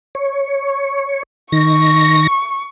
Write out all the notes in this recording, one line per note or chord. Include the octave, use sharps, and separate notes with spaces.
C#5
D#3 C#6 A#6